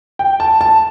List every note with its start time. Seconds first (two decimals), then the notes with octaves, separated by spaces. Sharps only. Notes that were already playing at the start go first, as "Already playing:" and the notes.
0.19 G5
0.40 A5
0.61 A5